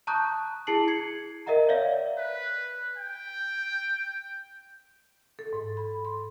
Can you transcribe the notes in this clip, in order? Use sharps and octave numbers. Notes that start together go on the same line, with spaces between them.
A5 A#5 C#6 D#6 F#6 G6
E4 G#4 A5 C7 F#7
G#6 C7 C#7
A#4 D#5 E5 F#5 A#5
C#5 D5 E5 F5
B4
G5
A4
G#2
B5
C6